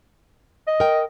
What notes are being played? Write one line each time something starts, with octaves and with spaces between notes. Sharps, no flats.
D#5
A#4 G5